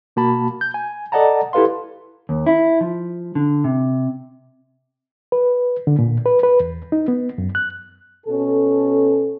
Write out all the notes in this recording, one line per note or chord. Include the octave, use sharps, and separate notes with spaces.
B2 A#3 F#4 A5 B5
G6
G#5
A4 D5 D#5 F#5 A5 A#5
E4 G4 A4 B4 F5 C6
D#2
E4
F3
D3
C3
B4
D3
A#2
B4
B4
E2
D#4
B3
F#2
F#6
B2 C#4 A4